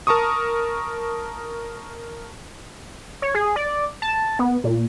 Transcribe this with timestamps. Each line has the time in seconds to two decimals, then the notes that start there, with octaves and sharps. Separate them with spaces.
0.07 A#4 A5 A#5 C#6 D#6
3.22 C#5
3.35 G#4
3.56 D5
4.02 A5
4.39 B3
4.64 A#2